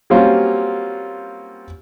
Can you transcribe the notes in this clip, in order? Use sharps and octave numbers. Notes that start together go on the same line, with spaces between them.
F#3 G3 A#3 C4 C#4 F4